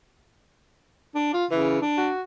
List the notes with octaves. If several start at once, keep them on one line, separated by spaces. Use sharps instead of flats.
D4
F4
C#3 E3
D4
F#4